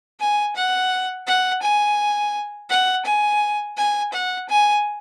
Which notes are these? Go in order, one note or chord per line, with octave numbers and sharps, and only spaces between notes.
G#5
F#5
F#5
G#5
F#5
G#5
G#5
F#5
G#5